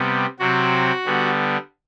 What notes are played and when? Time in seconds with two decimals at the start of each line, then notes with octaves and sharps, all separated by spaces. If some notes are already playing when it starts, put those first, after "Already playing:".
Already playing: C3 G3 B3
0.39 C3 F#3 C4 F#4
1.05 D3 G3 B3